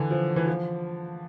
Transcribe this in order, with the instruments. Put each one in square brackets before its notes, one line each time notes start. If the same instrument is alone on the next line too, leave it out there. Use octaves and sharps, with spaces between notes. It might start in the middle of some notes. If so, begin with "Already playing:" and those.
Already playing: [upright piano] D3 E3
F3
E3
F3